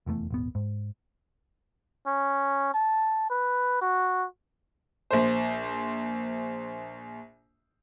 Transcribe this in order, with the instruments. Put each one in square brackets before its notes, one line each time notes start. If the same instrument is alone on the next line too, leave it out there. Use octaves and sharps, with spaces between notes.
[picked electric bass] F1 E2 C#3 A3
D#1 G#1 B3
G#2
[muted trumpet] C#4
A5
B4
F#4
[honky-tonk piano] A#1 C5